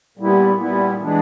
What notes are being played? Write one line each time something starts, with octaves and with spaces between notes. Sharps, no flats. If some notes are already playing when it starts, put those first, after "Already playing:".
A#2 G3 B3 E4
A#2 G3 B3 E4
E3 G#3 B3 D4